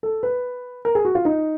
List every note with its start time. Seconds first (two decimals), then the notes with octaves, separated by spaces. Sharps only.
0.03 A4
0.23 B4
0.85 A#4
0.95 G#4
1.05 F#4
1.15 F4
1.25 D#4